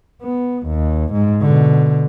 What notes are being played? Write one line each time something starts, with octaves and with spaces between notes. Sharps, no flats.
B3
D#2
G#2
B2 D3